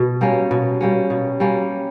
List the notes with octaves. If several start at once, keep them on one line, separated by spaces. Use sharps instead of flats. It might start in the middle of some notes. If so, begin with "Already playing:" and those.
Already playing: B2
G3 A#3 C#4
B2
G3 A#3 C#4
B2
G3 A#3 C#4